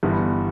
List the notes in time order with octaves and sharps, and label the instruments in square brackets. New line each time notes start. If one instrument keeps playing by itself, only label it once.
[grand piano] G1 G2 E3 B3